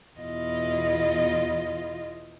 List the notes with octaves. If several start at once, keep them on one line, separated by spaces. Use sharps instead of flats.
E2 B2 E4 F4 D#5